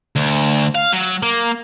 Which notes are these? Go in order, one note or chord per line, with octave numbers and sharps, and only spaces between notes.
D2
F5
F#3
A#3